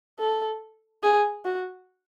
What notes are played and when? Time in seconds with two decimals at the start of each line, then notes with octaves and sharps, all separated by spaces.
0.19 A4
1.03 G#4
1.45 F#4